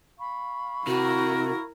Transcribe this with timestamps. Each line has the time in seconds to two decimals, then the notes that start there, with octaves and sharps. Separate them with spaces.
0.18 F5 B5 C#6
0.87 C3 E4 F#4 A#4